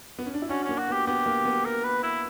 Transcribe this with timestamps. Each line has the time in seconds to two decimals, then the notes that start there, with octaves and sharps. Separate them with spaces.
0.19 B3
0.26 C#4
0.34 D4
0.42 E4
0.49 C#4 D4 F#4
0.64 C#4
0.69 A#3
0.78 F#4
0.88 B3 G4
1.07 B3 G4
1.26 A#3
1.45 B3
1.65 A#4
1.84 B4
2.03 E4